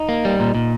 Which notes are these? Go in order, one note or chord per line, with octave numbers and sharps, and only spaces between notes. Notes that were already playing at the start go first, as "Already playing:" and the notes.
Already playing: D#4
A#3
G3
A#2
A#2